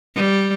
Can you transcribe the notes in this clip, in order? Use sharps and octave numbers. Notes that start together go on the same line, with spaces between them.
G3